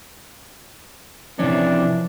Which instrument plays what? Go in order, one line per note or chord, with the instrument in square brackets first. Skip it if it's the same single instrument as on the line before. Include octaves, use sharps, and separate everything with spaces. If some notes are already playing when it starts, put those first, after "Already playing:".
[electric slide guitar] C3 C#4 [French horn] E3 [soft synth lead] F3 [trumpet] D4